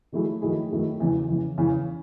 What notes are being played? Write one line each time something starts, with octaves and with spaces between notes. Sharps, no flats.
D#3 F#3 A3 E4 G#4
D#3 F#3 A3 E4 G#4
D#3 F#3 A3 E4 G#4
E2 C#3 E3
E2 C#3 E3
E2 C#3 E3